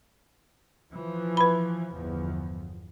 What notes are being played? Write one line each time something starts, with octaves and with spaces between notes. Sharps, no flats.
E3 F3
B4 B5
G1 E2 F3